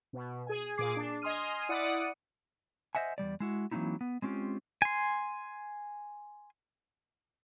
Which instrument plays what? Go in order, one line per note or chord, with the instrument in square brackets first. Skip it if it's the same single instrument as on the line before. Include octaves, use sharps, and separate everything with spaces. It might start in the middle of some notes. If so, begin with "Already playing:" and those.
[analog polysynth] B2
G#4 G#5
A#2 G#4 D6 C7
D4
D#5 G#5 C6 D#6 F6 D#7
E4 D5 F#5 D#6 C#7 D#7
[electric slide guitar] C5 D#5 E5 F#5 G#5
E2 C#3 G3 D5
G#3 E4 F#4
E3 F#3 A#3 C4 D#4 E4
B3
G#3 C4 C#4 F4 G4
[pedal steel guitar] G#5 C6